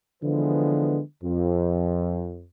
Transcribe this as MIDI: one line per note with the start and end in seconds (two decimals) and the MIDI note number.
0.23 0.99 50
0.23 0.99 52
0.23 0.99 53
0.23 0.99 56
0.23 0.99 59
0.23 0.99 71
1.23 2.44 41